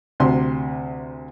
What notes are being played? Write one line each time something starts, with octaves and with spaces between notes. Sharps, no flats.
D2 C3 C6